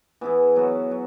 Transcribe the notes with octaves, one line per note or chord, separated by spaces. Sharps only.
E3 B3 E4 G#4
F#3 B3 F#4
F#3